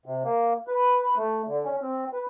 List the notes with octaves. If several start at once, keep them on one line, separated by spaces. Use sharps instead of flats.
C3
A#3
B4
A3
D3
C#4
C4
B4